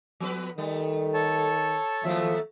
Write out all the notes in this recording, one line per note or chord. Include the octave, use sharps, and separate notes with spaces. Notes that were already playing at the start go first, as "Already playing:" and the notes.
F3 B3 B4
D#3 G3 A3
A4 C#5 A5
D#2 F3 F#3 A3 E5